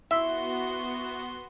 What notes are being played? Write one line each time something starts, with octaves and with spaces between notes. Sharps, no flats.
B3 E4 F#4 E5 C6